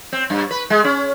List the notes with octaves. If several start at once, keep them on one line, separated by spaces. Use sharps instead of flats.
C4
G2
B4
G#3
C#4